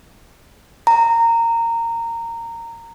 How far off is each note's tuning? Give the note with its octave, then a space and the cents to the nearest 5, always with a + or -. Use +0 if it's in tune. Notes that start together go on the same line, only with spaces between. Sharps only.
A#5 -15